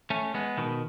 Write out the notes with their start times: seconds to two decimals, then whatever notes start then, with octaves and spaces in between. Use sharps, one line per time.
0.10 A3 C#4
0.34 G#3 B3
0.57 B2 D#3